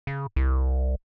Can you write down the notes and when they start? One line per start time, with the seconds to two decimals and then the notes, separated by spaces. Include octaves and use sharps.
0.07 C#3
0.36 C2